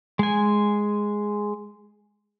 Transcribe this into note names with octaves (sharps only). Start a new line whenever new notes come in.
G#3 G#5